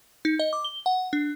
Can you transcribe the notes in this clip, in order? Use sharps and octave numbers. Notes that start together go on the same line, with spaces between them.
D#4
D#5
D6
G7
F#5
D4